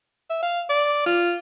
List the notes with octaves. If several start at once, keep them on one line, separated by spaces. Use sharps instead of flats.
E5
F5
D5
F4